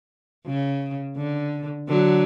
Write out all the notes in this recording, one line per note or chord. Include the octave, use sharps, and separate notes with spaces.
C#3
D3
D3 F#3